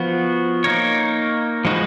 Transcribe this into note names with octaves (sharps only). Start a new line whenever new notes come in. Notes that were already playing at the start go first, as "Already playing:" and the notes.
Already playing: F3 B3 F#4
A#3 D#4 A#4 C#5
F3 G#3 D#4 F#4 B4